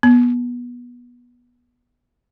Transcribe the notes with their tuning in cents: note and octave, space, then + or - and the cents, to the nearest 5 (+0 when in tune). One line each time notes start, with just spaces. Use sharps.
B3 -20